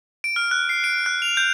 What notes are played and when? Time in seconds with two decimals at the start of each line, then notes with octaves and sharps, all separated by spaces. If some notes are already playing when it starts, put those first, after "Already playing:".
0.24 D7
0.36 F6
0.51 F#6
0.69 C7
0.84 D7
1.06 F#6
1.22 F7
1.37 G6